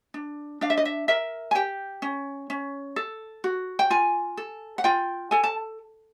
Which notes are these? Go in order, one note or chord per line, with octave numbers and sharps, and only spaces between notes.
D4
D4 F5
E5
D#5
E5
A#4 E5
G#5
G4 G5
C#4
C#4
A4
F#4
G5
F4 G#5
A4
F#5
F4 G5
A4 G#5
A5